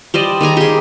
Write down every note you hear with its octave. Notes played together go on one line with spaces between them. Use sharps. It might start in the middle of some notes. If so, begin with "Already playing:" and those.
G3 C5 D5 D#5
D#3 G#4 G#5 A#5
G4 G#4